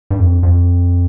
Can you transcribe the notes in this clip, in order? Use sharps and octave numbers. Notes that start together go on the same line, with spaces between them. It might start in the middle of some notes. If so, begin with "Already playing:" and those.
G2
F2
F2